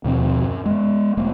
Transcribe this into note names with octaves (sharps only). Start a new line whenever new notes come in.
D#2 B2 F3 C4
F#2
G#3 B3
E1 A3 B3